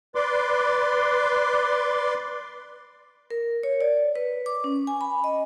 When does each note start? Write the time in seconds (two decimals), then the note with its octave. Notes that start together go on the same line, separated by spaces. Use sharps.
0.15 B4 D5 C6 D6
3.30 A#4
3.63 C#5
3.81 D5
4.16 B4
4.46 D6
4.64 C#4
4.87 G#5
5.01 B5
5.24 D#5